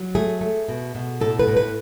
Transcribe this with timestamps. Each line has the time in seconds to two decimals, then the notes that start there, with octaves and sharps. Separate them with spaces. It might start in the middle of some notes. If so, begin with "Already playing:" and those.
Already playing: F#3
0.15 A3 G#4
0.41 A3
0.68 B2
0.95 B2
1.21 A2 A4
1.39 B4
1.48 A2
1.57 B4